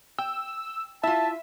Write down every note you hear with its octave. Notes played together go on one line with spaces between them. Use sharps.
G5 E6
E4 F4 E5 A5